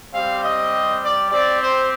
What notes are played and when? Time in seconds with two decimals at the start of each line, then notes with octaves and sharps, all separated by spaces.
0.14 G3 C4 G4 F5
0.43 D#5
1.02 D5
1.31 C4 G4 D5
1.60 C5